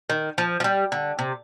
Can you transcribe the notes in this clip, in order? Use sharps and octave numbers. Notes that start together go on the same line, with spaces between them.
D#3
F3
F3
G3
D3
C3